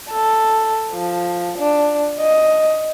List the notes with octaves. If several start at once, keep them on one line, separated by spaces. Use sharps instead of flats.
A4
F3
D4
D#5